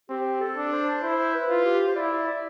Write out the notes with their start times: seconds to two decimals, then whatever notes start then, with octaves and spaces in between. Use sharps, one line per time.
0.09 C4 G4
0.41 A4
0.57 D4
0.72 C5
1.03 E4 C5
1.34 B4
1.49 F4
1.65 G4
1.87 C5
1.96 E4 D5
2.27 D5